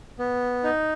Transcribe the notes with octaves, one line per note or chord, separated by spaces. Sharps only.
B3
D#4